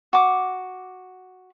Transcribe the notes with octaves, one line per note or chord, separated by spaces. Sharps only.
F#4 D6